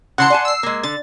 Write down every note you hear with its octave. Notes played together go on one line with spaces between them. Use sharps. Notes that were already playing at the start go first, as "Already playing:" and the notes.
C#3 E3 F#5 A5 C6 C#7
D5 G#5 A5
E6 C7
G#3 A#3
D3 A6